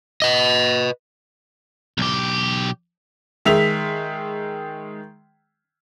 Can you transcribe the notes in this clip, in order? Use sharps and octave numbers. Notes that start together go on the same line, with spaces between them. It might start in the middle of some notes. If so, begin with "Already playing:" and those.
B4 D#5
B1 G4
D#3 G#3 E5 B6 F7